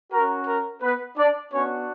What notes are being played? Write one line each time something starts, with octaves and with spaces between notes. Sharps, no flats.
C#4 F#4 A#4
A#4
B3 B4
D4 D5
B3 C#4 D4 F#4 C#5